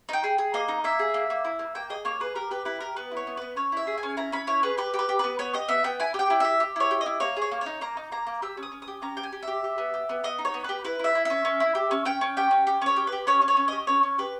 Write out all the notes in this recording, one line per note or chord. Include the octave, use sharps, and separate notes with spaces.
D#4 G5
G#4
G#4
A#3 D#5
D#4
A#3 E5
G#4
A#3
A#3
E4
A#3
A#3 G5
G#4 D#5
A#3 C#5
G#4 B4
G4 A#4
G4 B4
E4 B4
G4 A#4
B3 B4
E4
C#5
B3
B3 B4
C#4 C#5
E4 E5
G#4
G#5
C#4
E4 A#5
C#4 B5
E4 C#5
G#4 B4
G4 B4
G4
B4
G4
B3 B4
B3 C#5
G4 D#5
B3 E5
B3 G5
E4 G#5
G4
G5
E4
G4 E5
G4
E4 C#5
G4
D#5
E4
A#3 C#5
G#4
C#5
A#3
D#4 C#5
A#3 A#5
D#4
A#3 A#5
A#3
G4 E6
C#4
D#6
C#4
D#6
G4
C#4 A#5
G4 G5
G#5
G4
G4 E5
G4
B3
G4
B3
B3 D#5
D#4
C#5
B3
G4 B4
E4 B4
E4 E5
E4
C#4 E5
C#4
E4
G4
C#4
C#4 G5
C#4
G4 G5
C#4
G4
C#4 C#5
G4
G4 B4
C#4 C#5
C#4
C#5
C#4
G4 D#5
C#4 C#5
C#4
G4 B4